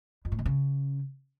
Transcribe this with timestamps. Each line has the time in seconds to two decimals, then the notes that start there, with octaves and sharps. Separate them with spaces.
0.25 F2
0.32 A2
0.39 D#3
0.46 C#3